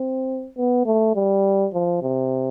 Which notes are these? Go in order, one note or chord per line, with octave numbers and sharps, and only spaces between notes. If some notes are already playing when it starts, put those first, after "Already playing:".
Already playing: C4
B3
A3
G3
F3
C3